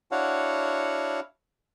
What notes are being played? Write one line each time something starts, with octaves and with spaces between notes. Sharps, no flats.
D4 E4 F#4 C#5 F5 F#5